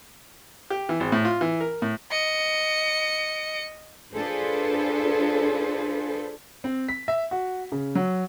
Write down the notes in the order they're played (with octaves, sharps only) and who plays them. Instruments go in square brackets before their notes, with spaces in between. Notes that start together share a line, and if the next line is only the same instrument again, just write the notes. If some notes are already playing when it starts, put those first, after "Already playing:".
[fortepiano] G4
E3
G#1
A2
F4
E3
A#4
A2
[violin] D#5 C#7
[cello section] D4 F4 G#4 A4 B4 C5
[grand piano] C4
B6
E5
F#4
C#3
F#3